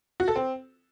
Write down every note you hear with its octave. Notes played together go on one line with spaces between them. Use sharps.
F#4
A4
C4